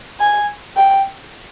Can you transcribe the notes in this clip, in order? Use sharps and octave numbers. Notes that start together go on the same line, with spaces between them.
G#5
G5